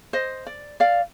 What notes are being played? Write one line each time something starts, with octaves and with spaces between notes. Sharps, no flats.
C5 D#5
D5
D5 F5